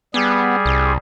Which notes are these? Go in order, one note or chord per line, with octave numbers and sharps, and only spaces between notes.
G3 B3 G#4
C2